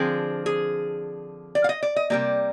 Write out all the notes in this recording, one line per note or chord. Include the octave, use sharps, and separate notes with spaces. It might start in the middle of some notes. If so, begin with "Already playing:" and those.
Already playing: D3 F3 C4 G#4
G#4
D5
F5
D#5
D5
D#5
C3 G3 A#3 D5